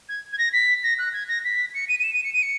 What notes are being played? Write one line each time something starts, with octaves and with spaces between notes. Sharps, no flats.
G#6
G#6
A#6
B6
A#6
F#6
G#6
A#6
B6
C#7
D#7
D#7
E7
D#7
C#7
D#7
C#7